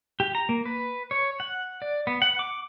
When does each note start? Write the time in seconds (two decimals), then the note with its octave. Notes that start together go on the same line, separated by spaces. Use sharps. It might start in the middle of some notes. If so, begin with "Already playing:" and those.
0.20 G4
0.35 A#5
0.49 A#3
0.65 B4
1.11 C#5
1.40 F#5
1.82 D5
2.07 B3
2.22 F#5
2.39 D6